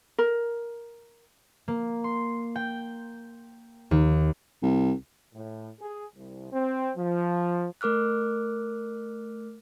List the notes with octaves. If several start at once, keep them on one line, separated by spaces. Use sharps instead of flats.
A#4
A#3
C6
G5
D#2
C2
A2
G#4
C2
C4
F3
A3 A#4 D6 F6 F#6